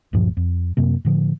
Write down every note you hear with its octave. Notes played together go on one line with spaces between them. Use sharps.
D1 G2 A#2 F3
F2
F#2 C3 A#3
A2 D3 F3